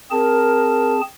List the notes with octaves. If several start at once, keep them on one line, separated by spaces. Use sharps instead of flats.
C4 G#4 A#4 A5